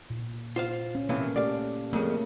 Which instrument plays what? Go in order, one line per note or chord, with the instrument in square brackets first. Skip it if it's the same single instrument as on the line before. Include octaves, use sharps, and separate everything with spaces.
[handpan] A#2
[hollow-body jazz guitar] F4 C5 F5
[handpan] C#4
[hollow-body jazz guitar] A2 C3 E3 [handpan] A#3 F5
[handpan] A3 G4 A4 [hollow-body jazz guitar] D5 F5
[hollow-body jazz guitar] F2 C#3 [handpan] A3 A#3